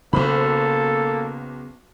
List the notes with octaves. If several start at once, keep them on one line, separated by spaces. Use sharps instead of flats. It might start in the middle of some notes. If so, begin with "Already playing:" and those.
B1 C#3 A#3 B3 A4 C5 B5